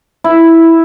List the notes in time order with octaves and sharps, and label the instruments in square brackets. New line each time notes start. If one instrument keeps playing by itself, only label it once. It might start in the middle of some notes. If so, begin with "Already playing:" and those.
[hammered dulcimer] E4